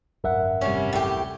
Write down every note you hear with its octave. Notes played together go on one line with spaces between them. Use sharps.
D1 G#1 F#2 A#4 E5 F#5
C3 G3 C#4
A2 G4